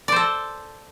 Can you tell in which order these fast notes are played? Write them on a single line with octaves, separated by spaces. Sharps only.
D5 C5 A4